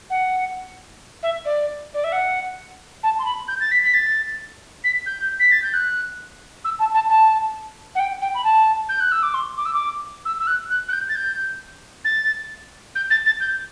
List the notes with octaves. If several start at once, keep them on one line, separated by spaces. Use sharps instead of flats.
F#5
E5
D5
D5
E5
F#5
A5
C6
B5
G6
A6
B6
B6
A6
B6
G6
B6
A6
G6
F#6
E6
A5
A5
A5
F#5
G5
G5
B5
A5
G6
F#6
E6
D6
C6
D6
E6
D6
E6
E6
F#6
F#6
F#6
G6
A6
G6
A6
G6
A6
A6
G6